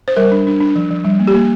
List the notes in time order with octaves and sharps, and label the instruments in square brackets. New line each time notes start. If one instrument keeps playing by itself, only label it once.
[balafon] C5
G3 A#4
D4
D4
D4
F3
F3
G3
A#3
G4
A#3